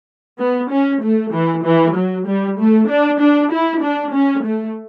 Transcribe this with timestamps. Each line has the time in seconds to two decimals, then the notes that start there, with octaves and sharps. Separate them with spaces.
0.39 B3
0.71 C#4
1.03 A3
1.33 E3
1.65 E3
1.96 F#3
2.27 G3
2.59 A3
2.90 D4
3.21 D4
3.52 E4
3.83 D4
4.14 C#4
4.45 A3